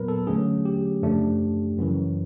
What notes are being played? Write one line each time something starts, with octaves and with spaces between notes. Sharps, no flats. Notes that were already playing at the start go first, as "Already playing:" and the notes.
Already playing: A#2 F#3 B3 A#4 B4
A4
D3 F#3 A3 C#4 G#4
G4
F#2 C#3 F3 A3 D4
F#2 C#3 E3